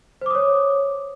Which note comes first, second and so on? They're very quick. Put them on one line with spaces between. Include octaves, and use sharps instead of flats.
C5 D6 D#6 C#5